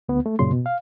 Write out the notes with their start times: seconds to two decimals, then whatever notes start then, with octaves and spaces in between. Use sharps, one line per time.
0.09 D2 B3
0.26 A3
0.39 F#2 A#2 C#3 C6
0.52 B2
0.66 F5